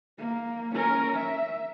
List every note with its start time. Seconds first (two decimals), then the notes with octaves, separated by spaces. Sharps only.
0.18 A#3
0.74 C#4 A#4
1.15 E5